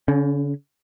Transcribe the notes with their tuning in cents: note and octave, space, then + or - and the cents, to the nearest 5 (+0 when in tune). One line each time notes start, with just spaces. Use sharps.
D3 -45 C#4 +0